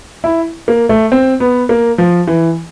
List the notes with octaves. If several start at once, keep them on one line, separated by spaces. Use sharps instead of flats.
E4
A#3
A3
C4
B3
A#3
F3
E3